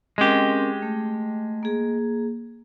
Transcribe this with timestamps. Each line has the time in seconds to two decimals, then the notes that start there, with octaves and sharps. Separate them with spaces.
0.18 G#3 C4 C#4 G4 A#4
0.82 A3
1.63 A#3 G#4